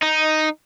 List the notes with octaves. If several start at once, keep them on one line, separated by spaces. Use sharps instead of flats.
D#4